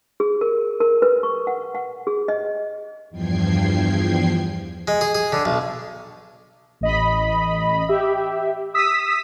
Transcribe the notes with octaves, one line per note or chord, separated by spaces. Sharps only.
G#4
A#4
A#4
B4
C#6
F#5
F#5
G#4
D#5
E2 G2 F3 G5 G#6 C7
G#3
G#4
G#4
D3
B1
A1 D#5 B5
G4 E5
D#6 E6 B6